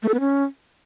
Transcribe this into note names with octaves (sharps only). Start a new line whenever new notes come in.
A3
A4
B3
C#4